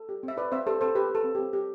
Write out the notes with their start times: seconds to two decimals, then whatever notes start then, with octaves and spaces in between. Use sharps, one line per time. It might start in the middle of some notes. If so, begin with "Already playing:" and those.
Already playing: A4
0.09 G4
0.23 C4
0.28 E5
0.37 E4 B4 D5
0.52 C4 C5 E5
0.67 G4 A4 C5
0.81 C4 A4 C5
0.95 G4 B4
1.10 G4
1.15 A4
1.24 C4
1.35 C4 G4
1.53 G4